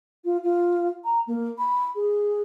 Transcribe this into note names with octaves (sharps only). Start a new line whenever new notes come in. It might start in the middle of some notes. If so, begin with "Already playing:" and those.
F4
F4
A#5
A#3
B5
G#4